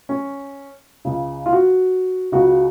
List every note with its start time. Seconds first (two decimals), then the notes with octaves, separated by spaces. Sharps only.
0.09 C#4
1.05 C#2 C#3
1.46 F4
1.53 F#4
2.32 C#2 C#3 F#4